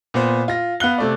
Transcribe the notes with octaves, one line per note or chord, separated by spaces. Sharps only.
A#2 B3 C5
F4 A#6
B3 F5 F#6 G7
C3 A3 D5